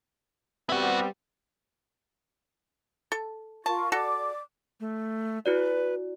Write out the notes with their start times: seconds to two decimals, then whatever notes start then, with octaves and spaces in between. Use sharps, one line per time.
0.69 G3 B3 C4 E4 F#4
3.12 A4
3.66 F4 A#4 A5 C#6
3.92 F#4 A4 D5 D6
4.80 A3
5.46 E4 F#4 B4 D5